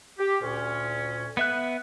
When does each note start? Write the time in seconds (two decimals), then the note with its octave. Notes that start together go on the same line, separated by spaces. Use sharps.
0.19 G4
0.42 D2 A#2 C#4
1.37 B3 E5 F#6